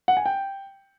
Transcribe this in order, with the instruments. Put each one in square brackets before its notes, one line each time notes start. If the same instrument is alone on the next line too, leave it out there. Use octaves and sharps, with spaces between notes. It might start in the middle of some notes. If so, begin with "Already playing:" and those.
[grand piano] F#5
G#5
G5